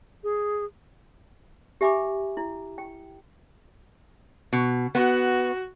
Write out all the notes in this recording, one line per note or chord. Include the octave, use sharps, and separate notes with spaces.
G#4
G4 E5 G#5 B5 D6
E4
G5
B2
B3 F#4